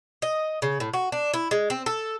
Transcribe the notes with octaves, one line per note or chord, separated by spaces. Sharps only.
D#5
C#3
A2
F#4
D4
E4
G#3
C4
A4